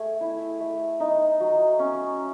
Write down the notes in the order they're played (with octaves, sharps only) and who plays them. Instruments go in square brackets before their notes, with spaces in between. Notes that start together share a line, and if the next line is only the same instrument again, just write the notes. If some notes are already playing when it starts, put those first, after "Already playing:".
Already playing: [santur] A3 G#4
E4
A3
D#4
F#3
C#4